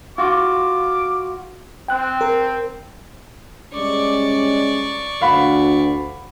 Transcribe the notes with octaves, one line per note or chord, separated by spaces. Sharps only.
F4 F#4 D6
C4 G5 F#6
A#4
G3 G#3 C#4 D5 C#6
D2 F5 F#5 B5